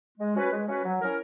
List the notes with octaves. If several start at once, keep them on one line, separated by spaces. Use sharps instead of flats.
G#3
C#4 F#4 B4
G#3
C#4 F#4 B4
F#3
C#4 E4 A#4